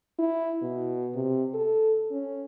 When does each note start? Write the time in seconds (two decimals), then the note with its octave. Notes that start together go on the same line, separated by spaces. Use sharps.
0.19 E4
0.62 B2
1.15 C3
1.54 A4
2.11 C#4